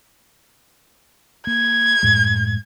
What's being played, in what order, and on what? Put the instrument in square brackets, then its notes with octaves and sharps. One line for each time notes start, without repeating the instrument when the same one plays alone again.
[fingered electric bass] A#3 [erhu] G#6
[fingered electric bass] F#2 A2 G#3